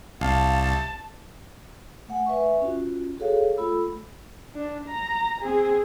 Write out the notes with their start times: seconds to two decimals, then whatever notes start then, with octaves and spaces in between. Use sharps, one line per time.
0.21 C2 F5 A5
2.08 A3 F#5 G#5
2.26 B4 E5 G#5 C#6
2.61 C#4 F4 F#4
3.18 F#4 G#4 A4 C#5 F5
3.58 A3 F4 A4 B5 E6
4.55 D4
4.88 A#5
5.41 C4 G#4